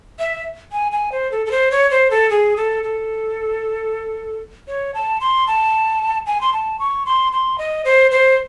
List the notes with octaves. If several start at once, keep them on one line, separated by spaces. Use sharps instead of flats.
E5
G#5
G#5
C5
A4
A4
C5
C#5
C5
A4
G#4
A4
A4
C#5
A5
C6
A5
G#5
C6
A5
C#6
C6
C6
D#5
C5
C5